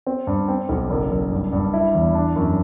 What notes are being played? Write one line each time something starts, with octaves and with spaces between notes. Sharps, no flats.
C4
G2
C4
B1
F#1
F#1
G2
G2
E4
E2
D4
F#2